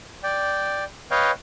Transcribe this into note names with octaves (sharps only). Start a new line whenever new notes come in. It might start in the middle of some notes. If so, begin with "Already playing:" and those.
D5 G5
B4 C#5 D#5 F5 G5